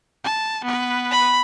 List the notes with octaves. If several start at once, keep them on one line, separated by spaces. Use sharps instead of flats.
A5
B3 B4
B5